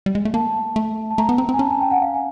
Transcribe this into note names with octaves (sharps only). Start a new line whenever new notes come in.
G3
G#3
A3
A#3 A5
A3
A5
A3 A#5
B3
C4 A#5
C4
G#5
C#4 A5
G#5
G5
F#5
F5
G#5